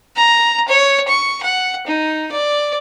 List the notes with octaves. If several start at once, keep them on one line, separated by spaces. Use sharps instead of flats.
A#5
C#5
C#6
F#5
D#4
D5